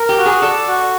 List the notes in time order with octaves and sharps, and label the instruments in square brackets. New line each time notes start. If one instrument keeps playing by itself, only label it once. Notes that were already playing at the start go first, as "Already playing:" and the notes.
Already playing: [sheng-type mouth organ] A#4
[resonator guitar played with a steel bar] G4
[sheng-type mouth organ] F#4
[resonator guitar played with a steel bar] G#4
[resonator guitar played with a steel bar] A4 [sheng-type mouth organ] D5
[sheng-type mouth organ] F#4